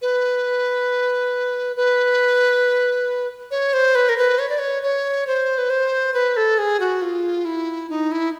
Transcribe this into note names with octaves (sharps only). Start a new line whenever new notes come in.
B4
B4
C#5
C5
B4
A#4
B4
C#5
D5
C#5
C#5
C5
B4
C5
B4
A4
G#4
F#4
F4
E4
D#4
E4